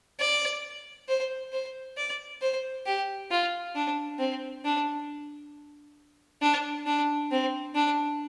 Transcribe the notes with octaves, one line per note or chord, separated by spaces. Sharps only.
D5
C5
C5
D5
C5
G4
F4
D4
C4
D4
D4
D4
C4
D4